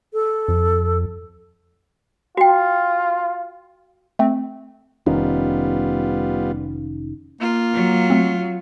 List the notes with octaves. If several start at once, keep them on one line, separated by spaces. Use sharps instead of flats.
A4
F2
F4 F#4 G5
A3 C4
F1 D#3 G3 B3 C#4 F4
A#3 F4
F#3
A3 C4